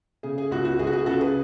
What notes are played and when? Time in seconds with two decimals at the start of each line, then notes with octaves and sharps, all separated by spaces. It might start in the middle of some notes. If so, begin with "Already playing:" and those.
0.23 C#3 G#4
0.38 G#4
0.51 C#2 F#4
0.65 F#4
0.79 C#2 G#4
0.87 F#4
0.93 G#4
1.06 C#3 F#4 A4
1.21 G#4 B4